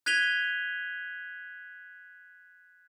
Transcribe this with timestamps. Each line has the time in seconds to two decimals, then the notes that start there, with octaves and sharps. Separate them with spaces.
0.06 F#6 G#6 B6 D#7 F7 G7